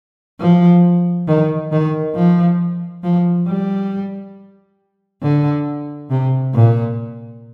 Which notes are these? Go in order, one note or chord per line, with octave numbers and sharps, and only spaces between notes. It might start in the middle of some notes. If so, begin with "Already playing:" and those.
F3
D#3
D#3
F3
F3
G3
D3
C3
A#2